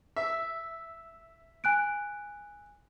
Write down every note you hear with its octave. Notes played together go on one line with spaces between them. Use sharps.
E5
G#5 F#6 D7